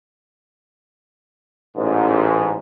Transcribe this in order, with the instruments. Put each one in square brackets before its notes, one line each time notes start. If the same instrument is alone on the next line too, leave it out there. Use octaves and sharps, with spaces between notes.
[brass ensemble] A1 G#2